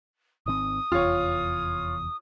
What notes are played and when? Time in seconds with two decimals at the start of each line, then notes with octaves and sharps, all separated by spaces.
0.46 G#1 D#3 C4 D#6
0.92 F1 E2 F4 C#5